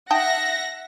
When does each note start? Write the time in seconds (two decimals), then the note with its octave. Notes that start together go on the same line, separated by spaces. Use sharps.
0.11 D#4 E5 F#5 G5 A5 A#6